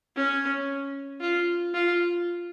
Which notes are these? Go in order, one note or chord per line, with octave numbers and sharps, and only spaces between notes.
C#4
F4
F4